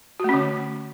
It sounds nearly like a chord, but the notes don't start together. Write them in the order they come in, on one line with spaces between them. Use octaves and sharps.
F#4 A3 C#4 D3